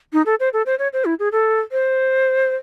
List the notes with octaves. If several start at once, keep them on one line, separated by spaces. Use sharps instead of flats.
D#4
A4
C5
A4
C5
C#5
C5
E4
G#4
A4
C5